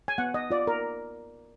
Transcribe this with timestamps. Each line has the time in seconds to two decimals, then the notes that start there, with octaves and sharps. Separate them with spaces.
0.08 G#5
0.18 B3 F#5
0.34 D#5
0.50 F4 D5
0.67 A#4